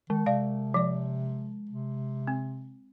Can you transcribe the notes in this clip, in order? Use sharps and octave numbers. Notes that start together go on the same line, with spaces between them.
D#3 G#3
C3 D5 F5
F3 D5
C3
C4